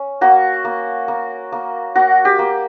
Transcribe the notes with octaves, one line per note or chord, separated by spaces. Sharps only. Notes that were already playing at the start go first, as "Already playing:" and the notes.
Already playing: C#4
A#3 F#4
A#3
A#3
A#3
A#3 F#4
G4
A#3